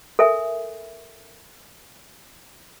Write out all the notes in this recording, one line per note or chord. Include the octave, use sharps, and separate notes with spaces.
A4 A#4 E5 G#5